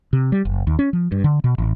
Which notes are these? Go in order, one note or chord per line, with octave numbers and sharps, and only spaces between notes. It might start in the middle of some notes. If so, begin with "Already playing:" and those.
C3
G3
F#1
D#2
C#4
F3
G2
D3
B2
A1